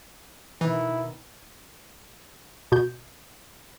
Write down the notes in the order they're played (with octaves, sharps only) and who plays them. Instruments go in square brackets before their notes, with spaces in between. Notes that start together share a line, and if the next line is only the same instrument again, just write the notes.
[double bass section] B2 D#3 [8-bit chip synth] E3 [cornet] E4
[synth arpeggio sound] B2 G6